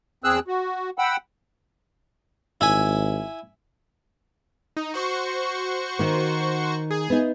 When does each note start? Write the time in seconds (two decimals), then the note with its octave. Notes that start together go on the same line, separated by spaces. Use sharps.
0.24 E2 C4 G#4 E6 F#6
0.48 F#4
0.98 F#5 G5 B5 E6
2.61 G#1 E4 E5 G#5
4.77 D#4
4.94 F#4 C5 C#6
5.99 D#3 A#3
6.91 G#4
7.10 B3 D#4